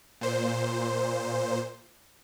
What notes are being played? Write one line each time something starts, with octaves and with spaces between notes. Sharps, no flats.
A#2 C5